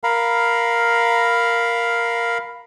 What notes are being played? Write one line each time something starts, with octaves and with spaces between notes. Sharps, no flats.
A#4 F5 A#5 B5